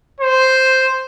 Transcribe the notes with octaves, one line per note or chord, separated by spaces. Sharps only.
C5